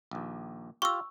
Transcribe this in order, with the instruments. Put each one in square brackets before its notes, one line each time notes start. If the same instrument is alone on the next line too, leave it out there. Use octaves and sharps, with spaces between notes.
[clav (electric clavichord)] A#1 D#2
[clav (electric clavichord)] F4 G4 [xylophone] C#6 E6